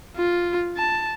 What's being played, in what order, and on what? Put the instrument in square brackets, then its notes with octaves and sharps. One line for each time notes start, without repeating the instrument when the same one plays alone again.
[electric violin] F4
A5